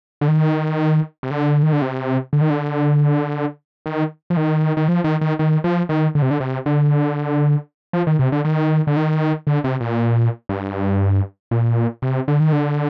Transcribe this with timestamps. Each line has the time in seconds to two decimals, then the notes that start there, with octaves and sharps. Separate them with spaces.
0.21 D3
0.28 D#3
1.23 C3
1.31 D3
1.63 D#3
1.73 D3
1.82 C3
2.33 D3
2.41 D#3
2.50 D3
3.86 D#3
4.30 F3
4.37 D#3
4.77 D#3
4.88 F3
5.04 D#3
5.21 D#3
5.39 D#3
5.64 F3
5.89 D#3
6.15 D3
6.22 C3
6.31 D3
6.40 C3
6.66 D3
7.93 F3
8.07 D#3
8.19 C3
8.32 D3
8.45 D#3
8.87 D3
8.97 D#3
9.47 D3
9.64 C3
9.81 A#2
10.49 G2
11.51 A#2
12.02 C3
12.28 D3
12.40 D#3
12.53 D3